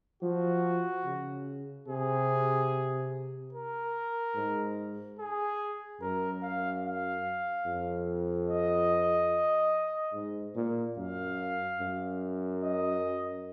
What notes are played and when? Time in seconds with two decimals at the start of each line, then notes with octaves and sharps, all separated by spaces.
0.23 F3 F#4
1.05 C#3
1.88 C3 G#4
3.53 A#4
4.36 G#2
5.19 G#4
6.01 F#2 A#4
6.43 F5
6.85 F5
7.67 F2
8.49 D#5
10.14 G#2
10.56 A#2
10.98 F#2 F5
11.81 F#2
12.63 D#5